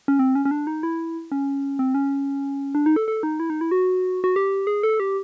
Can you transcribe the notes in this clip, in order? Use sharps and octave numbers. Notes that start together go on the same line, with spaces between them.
C#4
C4
C#4
C#4
D4
D#4
E4
C#4
C4
C#4
D4
D#4
A4
A4
D#4
E4
D#4
E4
F#4
F#4
G4
G#4
A4
G4